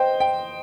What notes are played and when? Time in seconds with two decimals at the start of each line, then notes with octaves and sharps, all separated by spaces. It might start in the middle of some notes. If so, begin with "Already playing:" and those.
Already playing: C5 D#5 G5
0.20 G5